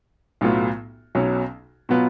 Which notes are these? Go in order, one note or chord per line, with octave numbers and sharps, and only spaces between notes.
B1 A2 F#3 B3 F4
B1 B2 F#3 C#4
B2 F#3 B3 F4